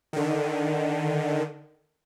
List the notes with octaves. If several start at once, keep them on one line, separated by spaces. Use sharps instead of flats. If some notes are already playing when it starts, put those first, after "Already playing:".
D3 D#3